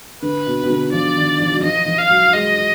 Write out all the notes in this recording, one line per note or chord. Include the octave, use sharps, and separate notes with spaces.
D3 B4
B2
B2
D3
F3 D5
D#3
F3
F#3
F3 D#5
F3
F5
F#3
G#3 D#5